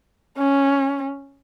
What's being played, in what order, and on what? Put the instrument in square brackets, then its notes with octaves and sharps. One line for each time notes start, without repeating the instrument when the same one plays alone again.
[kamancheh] C#4